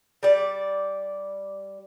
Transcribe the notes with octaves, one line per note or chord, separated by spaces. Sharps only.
G3 D5